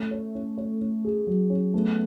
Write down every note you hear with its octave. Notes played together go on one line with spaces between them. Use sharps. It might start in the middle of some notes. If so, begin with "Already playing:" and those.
Already playing: A3 C#4
C#5
C#4
C#5
C#4
G#4
F#3
C#4
A3 B3